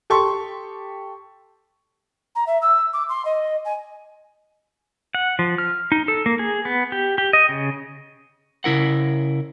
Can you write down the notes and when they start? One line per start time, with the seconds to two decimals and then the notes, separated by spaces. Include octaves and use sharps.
0.10 G4 A4 C6 C#6
2.35 A#5
2.46 E5
2.61 E6
2.93 D6
3.08 C6
3.25 D#5
3.65 G#5
5.15 F#5
5.39 F3
5.58 F6
5.92 D#4
6.08 A4
6.26 A#3
6.39 G#4
6.65 B3
6.92 G4
7.18 G4
7.33 D#5
7.49 C#3
8.64 C#3 E4 A#4 F#5